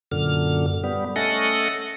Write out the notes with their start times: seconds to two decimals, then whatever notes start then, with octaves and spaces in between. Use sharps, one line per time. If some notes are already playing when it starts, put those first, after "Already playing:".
0.12 F#2 A#2 D3 F6
0.84 G3 B3
1.16 A3 C#4 A4 D#5 F#5